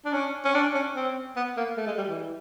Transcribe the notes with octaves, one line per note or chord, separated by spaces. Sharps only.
D4
C#4
C#4
D4
C#4
C4
B3
A#3
A3
G#3
G3
E3